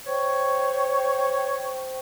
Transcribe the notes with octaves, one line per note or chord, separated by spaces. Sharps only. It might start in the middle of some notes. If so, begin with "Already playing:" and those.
C5 C#5 G5 C#6